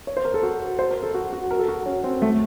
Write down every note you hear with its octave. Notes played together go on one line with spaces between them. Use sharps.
C#5
C5
A#4
A4
F#4
C5
A#4
A4
F#4
F#4
A#4
A4
F#4
C#4
C4
A3